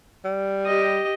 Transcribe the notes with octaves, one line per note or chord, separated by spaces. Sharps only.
G3
G4 D#5